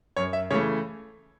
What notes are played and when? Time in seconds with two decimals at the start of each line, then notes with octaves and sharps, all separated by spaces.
0.17 F#2 C#5
0.33 E5
0.51 C#3 E3 A3 C#5